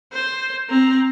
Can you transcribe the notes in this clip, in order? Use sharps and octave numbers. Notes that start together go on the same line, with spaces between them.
C5
C4 A#5